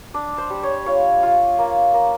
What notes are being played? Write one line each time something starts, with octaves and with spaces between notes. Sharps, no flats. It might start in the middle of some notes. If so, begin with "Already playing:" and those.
D4 D5
C5
G3
C#5
F4 C#5
F4
A#3
A#3